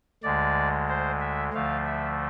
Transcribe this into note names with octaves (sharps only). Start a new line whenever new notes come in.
D2 D3 G#3 D5
C5
E5
D2 D3 F3 A3 F5
E5